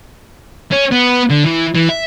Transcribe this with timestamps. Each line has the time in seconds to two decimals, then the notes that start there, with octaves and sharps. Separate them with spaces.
0.72 C#4
0.92 B3
1.30 D3
1.46 E3
1.75 E3
1.89 E5